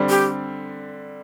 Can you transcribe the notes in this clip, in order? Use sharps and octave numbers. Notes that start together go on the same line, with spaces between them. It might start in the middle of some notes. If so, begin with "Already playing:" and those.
Already playing: D3 G3 C4
G4